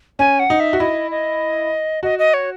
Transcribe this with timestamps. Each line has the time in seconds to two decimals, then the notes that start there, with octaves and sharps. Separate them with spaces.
0.19 C#4 G#5
0.39 F#5
0.50 D#4
0.60 E5
0.73 F#4
0.80 E4 D#5
1.11 D#5
2.03 F#4 D#5
2.19 D#5
2.34 C#5